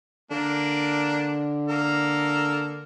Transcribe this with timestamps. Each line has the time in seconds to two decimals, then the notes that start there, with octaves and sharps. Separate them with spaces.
0.31 D3 A#3 D4
1.69 A#3 A4 A#4